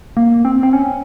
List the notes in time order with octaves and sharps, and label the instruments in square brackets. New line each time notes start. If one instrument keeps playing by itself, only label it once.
[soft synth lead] A#3
C4
C4
C#4